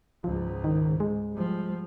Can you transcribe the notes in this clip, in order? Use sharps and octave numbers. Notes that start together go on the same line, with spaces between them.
C#2 G#2 F3
D#3
G#3
F3 G3